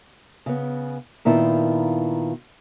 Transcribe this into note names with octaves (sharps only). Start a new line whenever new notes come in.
C#3 B3
A#2 D#3 B3 E4 F4 A5